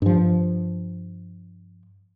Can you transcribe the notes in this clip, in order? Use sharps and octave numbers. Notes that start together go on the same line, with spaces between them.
G2 F3